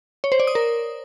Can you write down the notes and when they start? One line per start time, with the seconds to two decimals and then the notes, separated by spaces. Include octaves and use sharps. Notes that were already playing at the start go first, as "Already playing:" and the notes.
0.24 C#5
0.32 C5
0.40 D5
0.47 D#6
0.55 A#4